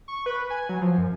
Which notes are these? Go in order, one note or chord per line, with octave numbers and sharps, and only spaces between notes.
C#6
B4
G#5
F#3
F3
F#2